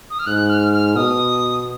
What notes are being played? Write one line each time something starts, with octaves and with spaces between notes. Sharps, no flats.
D#6
F6
G#2 F#6
F6
F6
B2 D#6